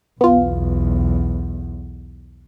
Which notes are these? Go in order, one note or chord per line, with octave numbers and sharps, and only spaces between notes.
B1 E2 B3 F4